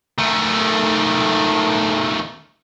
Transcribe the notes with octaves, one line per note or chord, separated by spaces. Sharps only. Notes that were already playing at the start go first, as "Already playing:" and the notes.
D#3 A3